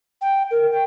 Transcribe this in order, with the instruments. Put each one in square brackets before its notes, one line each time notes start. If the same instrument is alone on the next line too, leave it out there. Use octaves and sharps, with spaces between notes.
[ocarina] G5
A#4
G5